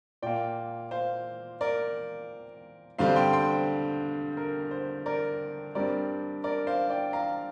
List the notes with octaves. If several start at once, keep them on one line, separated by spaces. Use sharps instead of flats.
A#2 A#3 D5 G5
C5 F5
A#4 D5
G2 D3 G3 C4 C5 F5
G5 C6
G5 C6
C5
A#4
C5
A#4 D5
G2 G3 C4 A#4 D5
A#4 D5
C5 F5
D5 G5
F5 A#5